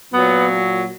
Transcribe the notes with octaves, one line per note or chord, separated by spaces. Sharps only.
A#2 F#3 B3